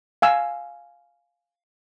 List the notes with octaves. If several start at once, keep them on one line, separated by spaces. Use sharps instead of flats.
F5 G#5 E6